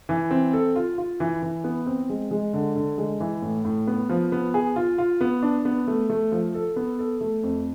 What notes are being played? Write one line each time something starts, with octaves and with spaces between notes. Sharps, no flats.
E3
C4
A4
F4
F4
E3
E3
B3
C4
G#3
G#3
D3
D3
G#3
E3
A2
A2
B3
F3
B3
G#4
F4
F4
B3
D4
B3
A3
A3
F3
A4
B3
A4
A3
F2